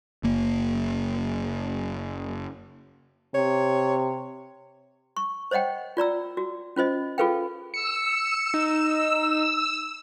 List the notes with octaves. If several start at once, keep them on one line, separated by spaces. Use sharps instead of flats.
F#1 A#3
C3 C#5
C#6
C5 C#5 D#5 F#5 G5
F4 D5 A#5 E6
F#4
C#4 F4 C5 D#5
F4 G#4 A4 B4 F5 G5
E6 C#7
D#4